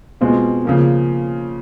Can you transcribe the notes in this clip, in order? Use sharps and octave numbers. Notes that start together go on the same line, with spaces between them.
B2 G#3 C4 F4
C#3 F3 A#3